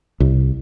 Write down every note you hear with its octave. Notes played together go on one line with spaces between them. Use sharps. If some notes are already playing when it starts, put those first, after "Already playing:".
C2